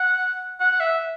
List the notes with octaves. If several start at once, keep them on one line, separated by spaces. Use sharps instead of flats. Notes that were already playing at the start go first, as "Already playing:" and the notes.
Already playing: F#5
F#5
E5